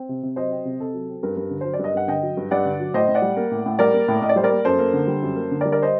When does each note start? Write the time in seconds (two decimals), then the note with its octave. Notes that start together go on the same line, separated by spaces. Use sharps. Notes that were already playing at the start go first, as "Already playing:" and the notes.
Already playing: C4
0.09 C3
0.23 C3
0.36 F#3 C5 D#5
0.51 C4
0.65 C3
0.80 C3 A4
0.94 F#3
1.09 C4
1.23 G2 A#4
1.37 G2
1.50 D3
1.61 F#3 C5
1.74 D5
1.79 G2 D#5
1.94 G2 F#5
2.07 D3 D#5 G5
2.23 F#3
2.37 G2
2.51 G2 D5 F#5
2.65 D3
2.80 F#3
2.94 A2 C5 D#5
3.08 A2
3.15 D5 F#5
3.22 G3
3.37 A#3
3.51 A2
3.66 A2
3.79 G3 A#4 D5
3.93 A#3
4.08 A2
4.22 A2 D#5
4.29 D5
4.36 G3 C5
4.44 A#4 D5
4.50 A#3
4.65 F#2 A4 C5
4.79 A#3
4.93 D3
5.07 G3
5.22 F#2
5.36 A#3
5.51 D3
5.61 A#4 D5
5.65 G3
5.72 A#4 D5
5.82 C5 D#5